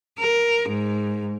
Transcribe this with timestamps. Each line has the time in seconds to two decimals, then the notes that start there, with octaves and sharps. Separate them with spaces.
0.18 A#4
0.66 G#2